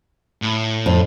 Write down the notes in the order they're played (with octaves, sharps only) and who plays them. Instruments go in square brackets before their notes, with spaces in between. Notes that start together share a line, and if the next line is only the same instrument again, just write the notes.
[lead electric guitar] A2
[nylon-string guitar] F2